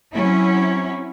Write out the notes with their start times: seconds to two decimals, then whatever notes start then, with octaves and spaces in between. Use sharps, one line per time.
0.12 F#3 C4 C#4 E4